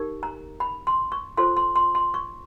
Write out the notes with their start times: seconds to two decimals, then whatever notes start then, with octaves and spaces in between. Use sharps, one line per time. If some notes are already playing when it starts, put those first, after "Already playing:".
Already playing: D#4 G4 A#4
0.23 A#5
0.60 B5
0.87 C6
1.12 C#6
1.37 F4 A4 C5 C6
1.57 C6
1.76 C6
1.95 C6
2.14 C#6